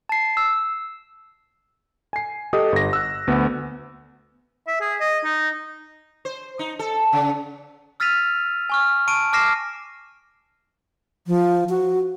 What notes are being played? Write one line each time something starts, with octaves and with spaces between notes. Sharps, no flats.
A5 C7
E6
G#5 C7
G4 A4 D#5 D#6
G1 A#6
E6 F#6
D2 B3
E5
G#4
D#5
D#4
C5
D#4
A4
C#3
E6 F6 A6 B6 D#7 F7
G#5 C#6 F6
A5 C#6 D7 D#7
A5 D6 F6 A#6 C7 E7
F3
F#4